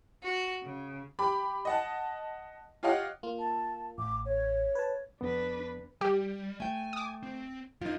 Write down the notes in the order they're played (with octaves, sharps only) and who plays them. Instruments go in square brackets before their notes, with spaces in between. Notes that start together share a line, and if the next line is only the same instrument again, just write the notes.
[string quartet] F#4
C#3
[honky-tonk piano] G4 B5 D6
D#5 F#5 A5
F4 G4 C#5 D#5 F5 F#5
[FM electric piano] A#3 F4
[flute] A5
[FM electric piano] A1 [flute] D6
[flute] C#5
[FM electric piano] B4 A5
[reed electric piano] F2 B3 [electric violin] D4 B4
[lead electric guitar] G3 [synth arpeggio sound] G4
[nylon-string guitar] A3 G5 [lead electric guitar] G#5
[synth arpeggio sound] D6 D#6
[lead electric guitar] C4
[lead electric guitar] F#2 [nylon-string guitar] D#4 F4